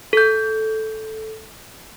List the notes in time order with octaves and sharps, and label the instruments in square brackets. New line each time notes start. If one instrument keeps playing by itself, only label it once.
[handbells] A4 G6